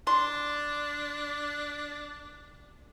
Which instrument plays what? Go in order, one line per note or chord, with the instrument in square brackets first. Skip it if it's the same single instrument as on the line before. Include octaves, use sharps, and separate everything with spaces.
[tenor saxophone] D4 [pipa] C6